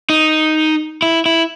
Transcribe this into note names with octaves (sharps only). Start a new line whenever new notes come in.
D#4
E4
E4